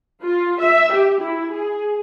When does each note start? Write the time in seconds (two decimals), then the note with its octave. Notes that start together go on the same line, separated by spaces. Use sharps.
0.22 F4
0.60 E5
0.92 G4
1.22 E4
1.52 G#4